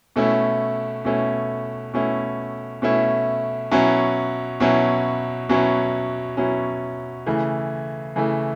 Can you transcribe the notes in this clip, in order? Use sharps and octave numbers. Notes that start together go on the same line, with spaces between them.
B2 A3 C#4 E4
B2 A3 C#4 E4
B2 A3 C#4 E4
B2 A3 C#4 E4
B2 F#3 C#4 E4
B2 F#3 C#4 E4
B2 F#3 C#4 E4
B2 F#3 C#4 E4
C#3 E3 A3
C#3 E3 A3